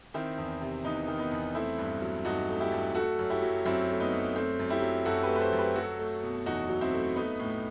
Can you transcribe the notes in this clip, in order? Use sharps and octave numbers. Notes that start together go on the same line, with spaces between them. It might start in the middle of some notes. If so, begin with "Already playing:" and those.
D#3 C4 E4
E2
C3
E2 B3 D#4
D#3
B3 D#4
E2
A3 C4 E4
G2
F#3
G2 D#4 F#4
A3
E4 G4
G2
A3 F#4 A4
F#2
E4 G4
F#3
F#2 C4 E4
A3
B3 D#4
F#2
A3 C4
F#2
E4 G4
F#3
F#2 F#4 A4
G4 B4
A3
B4
A4 C5
F#2
G4 B4
F#3 F#4 A4
A3
B2
E2 D#4 F#4
F#3
C4 E4
A3
A3 B3 D#4
A2